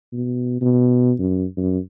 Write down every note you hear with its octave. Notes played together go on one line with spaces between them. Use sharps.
B2
B2
F#2
F#2